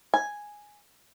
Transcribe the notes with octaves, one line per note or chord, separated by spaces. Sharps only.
G#5